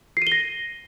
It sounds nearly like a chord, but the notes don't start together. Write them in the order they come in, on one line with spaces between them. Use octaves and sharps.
C7 D#7 G7 A#6